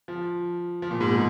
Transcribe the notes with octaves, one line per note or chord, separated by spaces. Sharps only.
F3
F3
A#2
G#2
B2